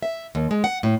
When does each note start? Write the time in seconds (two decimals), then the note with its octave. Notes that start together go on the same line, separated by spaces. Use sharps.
0.03 E5
0.35 D#2
0.51 G#3
0.64 F#5
0.83 A2